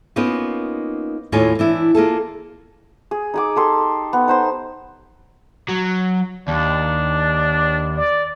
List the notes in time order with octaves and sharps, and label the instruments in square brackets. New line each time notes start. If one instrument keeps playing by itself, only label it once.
[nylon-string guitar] A#3 B3 C#4 D#4 F4
D#2 A2 F4 C#5 D5 G#5
E3 D4 E4
A#3 F4 G#4 A4
[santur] G#4
D#4 G#4 D6
G4 A4 C6
B3
D#4 C5 C6
[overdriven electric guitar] F#3
[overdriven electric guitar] D#2 [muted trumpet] D4
[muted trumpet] D5